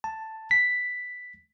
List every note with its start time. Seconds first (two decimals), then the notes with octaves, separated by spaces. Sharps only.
0.04 A5
0.51 B6